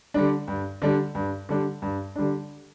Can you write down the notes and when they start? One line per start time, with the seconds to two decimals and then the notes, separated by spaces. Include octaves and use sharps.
0.14 D3 G3 D4
0.48 G2
0.82 D3 G3 D4
1.15 G2
1.49 D3 G3 D4
1.82 G2
2.16 D3 G3 D4